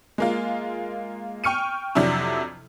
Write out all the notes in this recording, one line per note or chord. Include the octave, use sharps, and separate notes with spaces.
G#3 A#3 F4
G5 C#6 F6 C#7 D#7
F2 C3 F#3 D4 E4